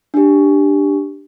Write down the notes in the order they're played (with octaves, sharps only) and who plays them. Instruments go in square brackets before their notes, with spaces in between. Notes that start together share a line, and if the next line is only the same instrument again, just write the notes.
[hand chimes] D4 G4